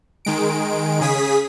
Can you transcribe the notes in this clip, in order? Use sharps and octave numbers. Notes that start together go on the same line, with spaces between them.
D#3 G#3 D7
C#3 G#4 D#6 B6